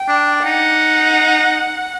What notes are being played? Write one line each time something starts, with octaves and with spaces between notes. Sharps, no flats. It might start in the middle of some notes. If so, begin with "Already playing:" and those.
Already playing: G5
D4
D#4 F#5